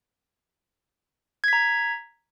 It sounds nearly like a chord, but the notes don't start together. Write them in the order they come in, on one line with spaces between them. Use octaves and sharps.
G#6 B6 A#5